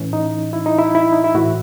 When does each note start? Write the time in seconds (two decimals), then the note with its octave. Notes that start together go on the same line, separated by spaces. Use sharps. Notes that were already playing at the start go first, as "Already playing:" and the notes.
Already playing: A2 E3 C#4
0.13 D#4
0.53 E4
0.66 D#4
0.78 E4
0.95 E4
1.12 D#4
1.24 E4
1.34 A2 E3 F#4